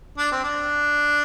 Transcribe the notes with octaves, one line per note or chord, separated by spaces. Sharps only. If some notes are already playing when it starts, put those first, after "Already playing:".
D4
C4
D4